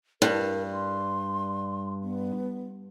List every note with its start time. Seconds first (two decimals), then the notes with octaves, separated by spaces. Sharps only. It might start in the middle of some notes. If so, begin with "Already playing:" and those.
0.22 G2 A#4
0.72 C6
2.03 B3